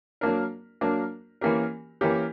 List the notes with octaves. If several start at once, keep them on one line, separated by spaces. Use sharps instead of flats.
F#3 A#3 D4 A#4
F#3 A#3 D4 A#4
E3 A#3 C#4 G4 A#4
E3 A#3 C#4 G4 A#4